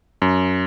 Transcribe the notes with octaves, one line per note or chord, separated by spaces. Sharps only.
F#2